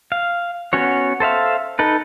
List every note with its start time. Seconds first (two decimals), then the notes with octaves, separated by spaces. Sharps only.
0.12 F5
0.73 B3 C#4 F#4 C#5
1.20 A4 C5 E5 F5
1.79 D#4 A4 B4